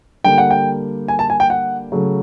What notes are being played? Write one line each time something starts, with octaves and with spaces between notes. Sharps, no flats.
D3 G3 A#3 G5
F#5
G5
G#5
A5
G#5
G5
F#5
C#3 F#3 A3